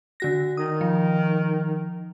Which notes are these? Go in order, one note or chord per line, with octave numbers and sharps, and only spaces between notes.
D3 F#4 A#6
D#3 D#6
F3